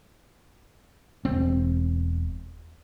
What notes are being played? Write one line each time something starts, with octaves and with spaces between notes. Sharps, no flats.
E1 C4